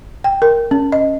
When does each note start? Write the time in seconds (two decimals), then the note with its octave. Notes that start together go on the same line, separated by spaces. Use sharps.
0.24 G5
0.42 A#4
0.71 C#4
0.92 D#5